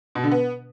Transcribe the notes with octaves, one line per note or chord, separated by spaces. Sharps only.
B2
D3
B3